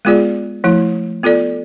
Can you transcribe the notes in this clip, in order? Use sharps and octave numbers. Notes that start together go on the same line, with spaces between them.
G#3 B3 F4 G#4 D5
F3 A3 E4
B3 F4 A4 D5